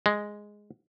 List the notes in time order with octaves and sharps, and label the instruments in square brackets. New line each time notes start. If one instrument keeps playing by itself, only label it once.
[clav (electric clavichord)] G#3